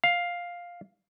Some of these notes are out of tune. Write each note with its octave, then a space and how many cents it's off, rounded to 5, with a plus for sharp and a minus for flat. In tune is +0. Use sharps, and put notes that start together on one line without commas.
F5 +5